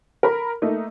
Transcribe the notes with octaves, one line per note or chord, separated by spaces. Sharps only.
A#4 A#5 B5
A3 A#3 D#4